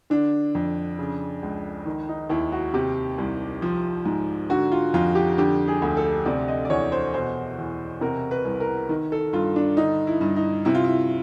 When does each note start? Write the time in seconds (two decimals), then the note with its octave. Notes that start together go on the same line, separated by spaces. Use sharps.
0.10 D3 D4
0.55 F2
0.99 C#3
1.43 C#2
1.86 D#3
2.09 D#4
2.30 D#2 E4
2.52 F#4
2.74 C3 G4
3.18 C2
3.62 F3
4.06 G#2
4.50 D3 F#4
4.72 F4
4.94 F2 F4
5.15 G4
5.38 D3 G4
5.68 G#4
5.82 D2
5.97 A4
6.25 C3 D5
6.48 D#5
6.65 D5
6.70 E2 C#5
6.92 C5
7.14 B2 C5
7.58 E2
8.01 C3 A#4
8.31 B4
8.45 C2
8.60 A#4
8.89 D#3
9.12 A4
9.33 G2 F4
9.56 D4
9.77 D3 D#4
10.07 E4
10.21 G2
10.36 D#4
10.65 C3 E4
10.75 F4
10.84 E4